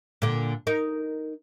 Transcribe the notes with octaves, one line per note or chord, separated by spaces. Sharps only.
A#2 D3
D#4 A#4